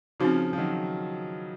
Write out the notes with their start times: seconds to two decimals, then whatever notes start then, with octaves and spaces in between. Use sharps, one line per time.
0.20 C#3 F3 C4 D#4 F#4
0.53 F3
0.58 D#3 F#3